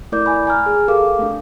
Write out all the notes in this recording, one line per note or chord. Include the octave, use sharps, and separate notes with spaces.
A3 E4 A#4 D5 D6 G6
G#5 B5
G#5 A#5 F6
G#4
G4 A4 A#4 F5 D6
A3 D4